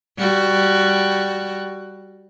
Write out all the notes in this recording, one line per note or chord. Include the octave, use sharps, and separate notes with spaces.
G3 F#4